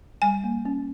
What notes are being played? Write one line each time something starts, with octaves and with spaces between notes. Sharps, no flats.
G3 G#5
A#3
C#4